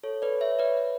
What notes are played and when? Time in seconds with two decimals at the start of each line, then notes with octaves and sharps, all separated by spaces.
0.03 A4 C#5
0.22 B4 D5
0.41 C#5 E5
0.59 B4 D5